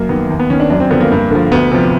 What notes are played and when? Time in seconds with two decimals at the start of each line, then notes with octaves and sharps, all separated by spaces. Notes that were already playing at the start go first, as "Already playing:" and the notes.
Already playing: F#2 A#3
0.09 D#3 B3
0.29 D#2
0.40 B3
0.50 D#3 C#4
0.60 D4
0.70 F#2 D4
0.80 C4
0.91 D3 F3 B3
1.01 A#3
1.11 G2
1.31 D3 F3
1.52 D2 B3
1.71 C3 F3